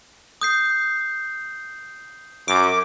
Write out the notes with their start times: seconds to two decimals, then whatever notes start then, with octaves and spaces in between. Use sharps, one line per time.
0.41 D#6 G6 C7
2.48 F#2 D6